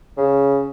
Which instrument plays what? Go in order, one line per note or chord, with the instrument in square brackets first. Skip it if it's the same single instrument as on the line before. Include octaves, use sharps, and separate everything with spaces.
[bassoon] C#3